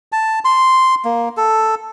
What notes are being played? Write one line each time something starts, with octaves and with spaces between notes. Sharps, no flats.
A5
C6
A#3
A4